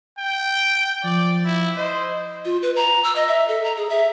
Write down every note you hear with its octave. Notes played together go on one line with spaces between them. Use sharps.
G5
F3 D5
E4
C5 D#5
F4
B4
A#5
E6
D#5
E5
A4
A#5
G#4
E5